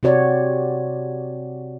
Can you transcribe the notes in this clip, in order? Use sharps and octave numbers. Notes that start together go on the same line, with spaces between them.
C3 C4 F#4 C#5 D5